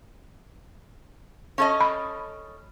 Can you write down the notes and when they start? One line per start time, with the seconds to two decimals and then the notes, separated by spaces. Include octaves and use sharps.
1.58 C#4 A4 D#5
1.81 B5